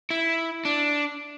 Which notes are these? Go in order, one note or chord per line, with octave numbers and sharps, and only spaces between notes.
E4
D4